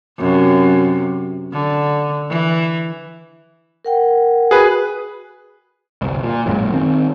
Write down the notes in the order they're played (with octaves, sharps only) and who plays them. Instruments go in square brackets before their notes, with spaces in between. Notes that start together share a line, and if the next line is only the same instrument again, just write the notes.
[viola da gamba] F#2 C3
D3
E3
[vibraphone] A#4 F#5 G5
[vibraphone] F#4 [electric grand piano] G#4 B4
[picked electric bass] G1 C2
A#2
A1 F#2 A#2 G#3
D#3 C4